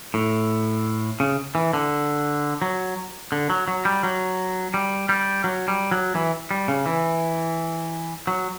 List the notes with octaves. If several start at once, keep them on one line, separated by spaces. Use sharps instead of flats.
A2
C#3
E3
D3
F#3
D3
F#3
F#3
G3
F#3
G3
G3
F#3
G3
F#3
E3
G3
C#3
E3
F#3